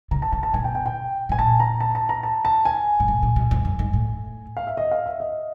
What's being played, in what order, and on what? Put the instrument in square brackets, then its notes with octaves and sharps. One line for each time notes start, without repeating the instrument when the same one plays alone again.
[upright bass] C#3 [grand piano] A#5
[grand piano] A5
[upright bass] C3 [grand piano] A5
[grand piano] A5
[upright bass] B2 [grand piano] G#5
[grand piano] G5
G5
G5
[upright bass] B2 [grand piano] G#5
[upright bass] A#2 [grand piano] A5
[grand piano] A#5
A5
A5
A#5
A5
A5
G#5
[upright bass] A2
A#2
A#2
B2
F2
F#2
G#2
A2
[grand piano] F5
E5
D#5
F5
E5
D#5